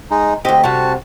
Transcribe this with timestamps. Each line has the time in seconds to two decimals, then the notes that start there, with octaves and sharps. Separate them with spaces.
0.11 G#3 D#4
0.45 D2 C4 G4 D#5
0.64 C3 G3 F#4 A5